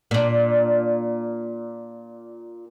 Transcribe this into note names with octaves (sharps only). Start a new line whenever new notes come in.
A#2 D4